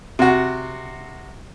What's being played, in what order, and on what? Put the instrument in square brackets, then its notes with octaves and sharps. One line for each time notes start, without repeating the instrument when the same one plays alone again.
[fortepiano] C3 F#4